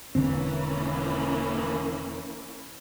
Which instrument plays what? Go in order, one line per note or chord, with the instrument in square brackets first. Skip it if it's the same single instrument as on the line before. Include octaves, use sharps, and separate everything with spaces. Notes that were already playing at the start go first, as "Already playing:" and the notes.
[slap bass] E1 D3 C4 [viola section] E3 A#3 C#4